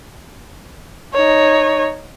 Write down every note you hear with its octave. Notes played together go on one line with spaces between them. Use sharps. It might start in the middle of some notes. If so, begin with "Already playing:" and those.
D#4 C#5